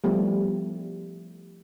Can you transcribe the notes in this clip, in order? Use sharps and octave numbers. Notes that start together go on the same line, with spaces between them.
F3 G3 A3 B3